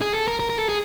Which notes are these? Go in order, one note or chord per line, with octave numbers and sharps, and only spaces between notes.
G#4
A4
A#4
A#4
A#4
A4
G#4